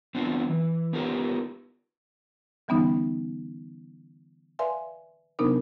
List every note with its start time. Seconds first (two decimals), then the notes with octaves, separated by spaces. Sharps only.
0.15 F3 B3 C4 D4 F4
0.49 E3
0.93 B3 D#4 F4 G4 A#4 B4
2.68 D3 E3 G3 B3 C#4 D#4
4.59 B4 D5 E5 F5 G#5 C6
5.39 C3 F#3 B3 D4 D#4 A#4